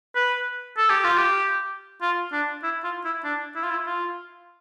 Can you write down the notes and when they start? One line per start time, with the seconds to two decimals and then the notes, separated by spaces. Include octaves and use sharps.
0.15 B4
0.77 A4
0.90 G4
1.04 F4
1.18 G4
2.02 F4
2.32 D4
2.63 E4
2.84 F4
3.05 E4
3.24 D4
3.55 E4
3.64 F4
3.71 E4
3.87 F4